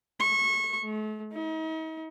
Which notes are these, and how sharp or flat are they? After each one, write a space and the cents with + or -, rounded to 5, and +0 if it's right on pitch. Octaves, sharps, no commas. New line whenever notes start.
C#6 -25
A3 -40
D#4 +40